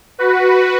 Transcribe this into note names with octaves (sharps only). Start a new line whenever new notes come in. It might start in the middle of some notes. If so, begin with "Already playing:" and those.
F#4 B4